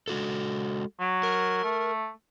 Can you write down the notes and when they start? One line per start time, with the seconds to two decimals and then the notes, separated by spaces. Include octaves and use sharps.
0.08 G#3 F#4 A4
1.00 F#3
1.23 A#4
1.63 A3